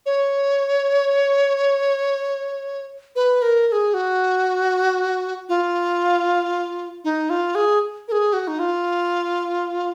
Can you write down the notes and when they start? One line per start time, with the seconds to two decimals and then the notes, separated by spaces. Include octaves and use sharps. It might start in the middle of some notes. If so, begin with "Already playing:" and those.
0.06 C#5
3.16 B4
3.42 A#4
3.68 A#4
3.72 G#4
3.94 F#4
5.49 F4
7.04 D#4
7.30 F4
7.55 G#4
8.08 A#4
8.12 G#4
8.33 F#4
8.48 D#4
8.59 F4